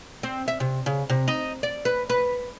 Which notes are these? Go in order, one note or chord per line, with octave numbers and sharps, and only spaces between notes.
C4
E5
C3
C#3
C3
D#4
D5
B4
B4